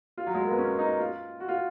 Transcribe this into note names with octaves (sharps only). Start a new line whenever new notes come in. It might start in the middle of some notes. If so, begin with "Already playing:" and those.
F4
F#3
G#3
A#3
B3
C#4
D#4
F4
F#4
F4